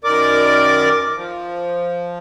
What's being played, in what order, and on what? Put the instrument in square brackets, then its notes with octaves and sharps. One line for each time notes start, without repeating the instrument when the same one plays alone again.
[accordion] F#2 D#3 A#4 D5 D6
F3